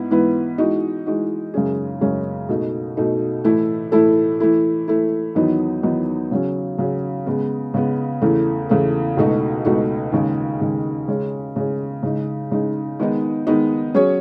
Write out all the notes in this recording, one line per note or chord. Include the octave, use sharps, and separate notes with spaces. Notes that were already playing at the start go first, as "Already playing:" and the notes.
Already playing: G#2 B3 E4
G#2 E3 B3 E4 B4
E3 G#3 D#4 F#4
E3 G#3 D#4 F#4
F#2 C#3 G#3 C#4 G#4
F#2 C#3 G#3 C#4 G#4
B2 A3 D#4
B2 A3 D#4
A2 E3 A3 E4 A4
A2 E3 A3 E4 A4
E3 A3 E4
E3 A3 E4
E2 D#3 F#3 B3 D#4
E2 D#3 F#3 B3 D#4
C#3 F#3 C#4
C#3 F#3 C#4
C#3 G#3 B3
C#3 G#3 B3
E2 C#3 E3 A3
E2 C#3 E3 A3
C#2 B2 A3 D#4 F#4
C#2 B2 A3 D#4 F#4
D#2 C#3 G#3
D#2 C#3 G#3
C#3 G#3 C#4
C#3 G#3 C#4
C#3 G#3 D#4
C#3 G#3 D#4
D#3 G#3 B3 D#4
D#3 G#3 B3 D#4
F#3 C#4 G#4 C#5